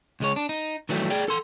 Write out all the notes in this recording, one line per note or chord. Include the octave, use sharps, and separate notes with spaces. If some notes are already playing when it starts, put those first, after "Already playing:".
C#2 G#3 C#5
D4
D#4
D#3 E3 F#3 G3 A3
G#4 D5 G5
A4 C6